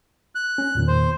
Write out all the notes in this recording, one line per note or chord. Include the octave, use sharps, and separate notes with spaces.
F#6
C#4
E2 A#2 D#3
C5